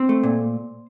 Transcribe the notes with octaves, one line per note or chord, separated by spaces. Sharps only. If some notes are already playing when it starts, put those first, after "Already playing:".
Already playing: C4 C5
A3
A#2